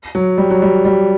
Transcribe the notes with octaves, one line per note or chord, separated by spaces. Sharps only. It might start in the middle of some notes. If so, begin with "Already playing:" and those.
F#3
G3
F#3
G3
G3